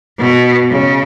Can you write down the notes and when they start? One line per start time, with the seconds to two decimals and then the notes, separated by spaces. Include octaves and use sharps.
0.18 B2
0.69 C#3